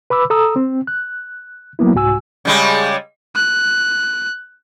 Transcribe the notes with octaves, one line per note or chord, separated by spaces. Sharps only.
B4 B5 D6 E6
A4 A#5 D#6 E6
C4
F#6
F#3 A#3 B3 E4
C2 G#2 F#4 G#5 E6
C#3 G3 G#3
F#6